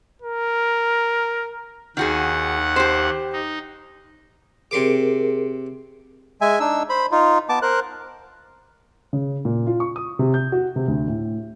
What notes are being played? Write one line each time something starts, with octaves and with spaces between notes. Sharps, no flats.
A#4
D#2 D#3 F#4 G#4 F#5
G4 C5
D#4
C3 G#4 A#4 C6 D6
G#3 E5 G#5
D4 D#4 E6
C5 B5
D#4 F4
B3 A5 D6
A#4 C5 F#6
C#3
A#2
F4
C#6
D#6
C3
G6
F#4
C3
D2
A2